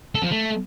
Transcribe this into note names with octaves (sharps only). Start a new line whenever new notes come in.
A4
F3
A3